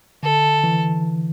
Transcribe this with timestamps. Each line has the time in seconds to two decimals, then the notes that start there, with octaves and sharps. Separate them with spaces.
0.23 D3 A4
0.64 E3